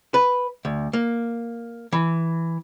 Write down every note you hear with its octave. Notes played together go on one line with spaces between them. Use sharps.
B4
D2
A#3
E3